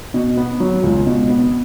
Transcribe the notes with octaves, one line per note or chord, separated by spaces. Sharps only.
B2
B3
F#3
C#2
B2
B3